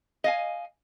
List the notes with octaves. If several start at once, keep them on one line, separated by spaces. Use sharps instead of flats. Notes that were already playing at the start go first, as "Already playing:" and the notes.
D#5 F5 G#5